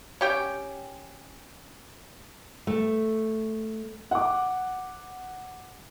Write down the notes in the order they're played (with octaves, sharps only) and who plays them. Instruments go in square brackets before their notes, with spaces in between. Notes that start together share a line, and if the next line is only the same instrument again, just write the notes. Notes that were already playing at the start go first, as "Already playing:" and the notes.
[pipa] C#4 G4 G5
[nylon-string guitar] A3
[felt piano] F#5 D6